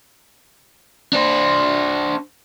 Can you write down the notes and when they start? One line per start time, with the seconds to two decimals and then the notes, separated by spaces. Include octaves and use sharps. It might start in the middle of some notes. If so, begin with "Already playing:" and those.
1.13 D4 C5